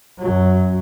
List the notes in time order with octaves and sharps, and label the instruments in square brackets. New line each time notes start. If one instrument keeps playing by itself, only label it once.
[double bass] F#2 F#3